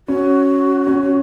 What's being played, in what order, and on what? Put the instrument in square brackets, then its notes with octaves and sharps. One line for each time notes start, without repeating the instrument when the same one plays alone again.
[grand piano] C#4 [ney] F#4
[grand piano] C#4